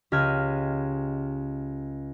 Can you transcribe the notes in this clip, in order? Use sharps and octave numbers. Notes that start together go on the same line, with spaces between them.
C#2 G4 D#5 F6 G#6